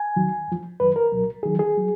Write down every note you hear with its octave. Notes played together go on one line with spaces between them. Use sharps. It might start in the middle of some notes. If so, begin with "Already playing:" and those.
Already playing: G#5
D#2 D#3 F#3
F2 F3
F#2 D#3 F#3 B4
A#4
C#2 B2 F#3
D#2 D#3 F#3 G#4
G#4
F#3